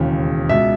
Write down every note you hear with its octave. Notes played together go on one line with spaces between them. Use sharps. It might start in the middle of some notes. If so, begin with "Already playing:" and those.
Already playing: E1 D#2 C#3 E3
C#2 B2 E5